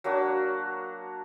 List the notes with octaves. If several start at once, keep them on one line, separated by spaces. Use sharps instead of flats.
F#3 A#3 D4 F#4